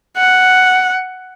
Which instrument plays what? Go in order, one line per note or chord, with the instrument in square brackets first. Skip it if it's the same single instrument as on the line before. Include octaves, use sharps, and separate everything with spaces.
[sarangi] F#5